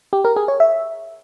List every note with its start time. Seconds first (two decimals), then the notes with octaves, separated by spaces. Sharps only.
0.13 G4
0.25 A#4
0.36 G#4
0.48 C#5
0.60 E5